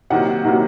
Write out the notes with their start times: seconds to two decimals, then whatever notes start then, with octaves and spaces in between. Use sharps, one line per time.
0.10 C3 D#3 F#3 A#3 F#5
0.45 C3 D#3 F#3 A#3